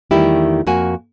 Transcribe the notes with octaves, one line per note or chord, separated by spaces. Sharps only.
E2 D#3 G3 A3 E4 G4
F2 A#3 F#4 G#5